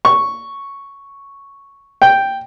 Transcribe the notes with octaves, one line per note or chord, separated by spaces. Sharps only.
C#6
G5